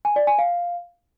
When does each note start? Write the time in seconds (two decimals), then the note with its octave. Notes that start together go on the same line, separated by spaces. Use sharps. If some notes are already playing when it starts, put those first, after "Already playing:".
0.05 G#5
0.16 D5
0.27 G#5
0.39 F5